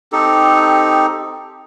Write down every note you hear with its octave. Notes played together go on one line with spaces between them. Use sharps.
C4 D#4 G4 A4